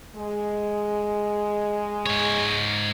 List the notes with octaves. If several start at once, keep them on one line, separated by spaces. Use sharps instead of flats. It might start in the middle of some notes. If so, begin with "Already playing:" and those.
G#3
G#2 C#5